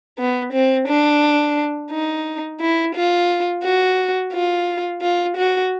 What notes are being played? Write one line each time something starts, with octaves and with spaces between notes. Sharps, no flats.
B3
C4
D4
D#4
E4
F4
F#4
F4
F4
F#4